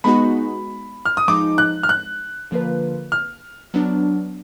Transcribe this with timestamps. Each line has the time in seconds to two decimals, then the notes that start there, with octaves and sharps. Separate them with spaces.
0.04 G#3 B3 D#4 F#4 B5
1.05 F6
1.17 D#6
1.28 F3 G#3 D#4 D6
1.58 F#6
1.83 F6
1.89 F#6
2.51 D3 F3 A#3 F4 B4
3.12 F6
3.74 F#3 B3 D4